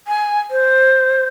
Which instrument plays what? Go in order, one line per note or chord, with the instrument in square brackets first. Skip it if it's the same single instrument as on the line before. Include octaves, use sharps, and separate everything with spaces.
[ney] G#5
C5